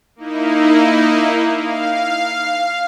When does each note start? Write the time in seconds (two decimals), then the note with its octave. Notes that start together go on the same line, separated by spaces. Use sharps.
0.16 A#3 D#4 E4
1.51 F5